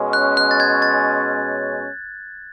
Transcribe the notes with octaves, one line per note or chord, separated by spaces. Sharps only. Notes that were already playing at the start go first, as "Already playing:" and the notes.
Already playing: B2 G#3 C#4
F#6
F#6
A6
G#6
A6